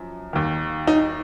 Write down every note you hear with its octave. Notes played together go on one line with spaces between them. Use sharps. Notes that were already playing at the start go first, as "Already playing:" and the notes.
Already playing: F#2 F3
D#2 D#3
D#4